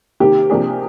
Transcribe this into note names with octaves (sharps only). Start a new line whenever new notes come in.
C3 D#3 A#3 G4
C3 F3 A#3 D4 G#4